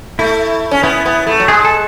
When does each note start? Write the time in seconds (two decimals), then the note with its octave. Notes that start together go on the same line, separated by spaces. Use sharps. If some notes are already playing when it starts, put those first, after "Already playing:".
0.19 A3 E4
0.71 C#4
0.83 B3 E4
1.06 B3
1.27 A3
1.40 F#3
1.48 G#3 G#4
1.65 A4